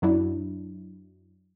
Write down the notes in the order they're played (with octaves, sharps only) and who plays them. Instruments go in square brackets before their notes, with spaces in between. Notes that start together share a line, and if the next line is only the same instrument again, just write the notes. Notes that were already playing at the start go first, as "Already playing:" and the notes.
[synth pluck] F#2 F#3 D4 E4